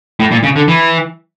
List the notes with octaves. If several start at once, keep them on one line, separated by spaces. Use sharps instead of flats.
A2
A#2
C#3
D3
E3